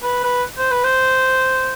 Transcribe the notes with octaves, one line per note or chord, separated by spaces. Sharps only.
B4
B4
C5
B4
C5